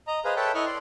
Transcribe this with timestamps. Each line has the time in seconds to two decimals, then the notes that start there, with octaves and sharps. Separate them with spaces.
0.07 D#5 A#5
0.25 G#4 B4 C5 D#5 F5
0.36 A4 B4 C#5 E5 G5 A5
0.54 E4 A4 D#5 C#6 F6 F#6
0.66 D5 C6